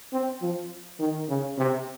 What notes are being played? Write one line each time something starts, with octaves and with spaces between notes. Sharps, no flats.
C4
F3
D#3
C#3
C3